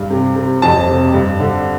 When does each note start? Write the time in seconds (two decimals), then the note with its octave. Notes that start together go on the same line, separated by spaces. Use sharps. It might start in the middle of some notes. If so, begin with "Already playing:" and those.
Already playing: G2
0.10 C3
0.36 C3
0.62 F2 A5
0.89 C3
1.14 G2
1.40 D3